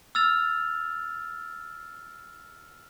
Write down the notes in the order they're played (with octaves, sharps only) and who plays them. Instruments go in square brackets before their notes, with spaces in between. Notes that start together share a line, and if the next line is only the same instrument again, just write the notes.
[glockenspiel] E6 F6 A6 F7